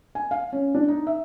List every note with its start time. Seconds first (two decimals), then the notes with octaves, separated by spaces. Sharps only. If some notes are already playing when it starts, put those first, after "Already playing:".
0.15 G#5
0.31 F5
0.53 C#4
0.74 D4
0.88 D#4
1.07 E5